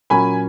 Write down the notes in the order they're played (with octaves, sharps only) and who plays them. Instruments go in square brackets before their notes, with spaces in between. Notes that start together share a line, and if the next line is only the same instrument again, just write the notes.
[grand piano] A#2 F#3 A#3 C#4 G#5 B5